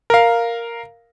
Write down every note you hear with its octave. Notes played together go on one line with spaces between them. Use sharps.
A#4 F5